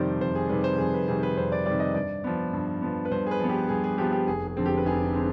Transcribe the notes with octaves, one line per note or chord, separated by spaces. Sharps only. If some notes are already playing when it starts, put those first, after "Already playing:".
Already playing: F2 C3 D#3 G3 C5 D5
F2 C5
G#4
C3 D#3 G3 B4
C5
F2 G#4
B4
C3 D#3 G3 G#4
B4
F2 C5
D5
C3 D#3 G3 D5
D#5
G2 D5
F3 B3
G2
F3 B3
B4
G2 C5
G#4
B4
F3 B3
G4
G2 G#4
G#4
F3 B3 G4
G4
F1 G#4
G#4
F2 D3 G#3 C4
G4
B4
F1 G#4
D3 G#3 C4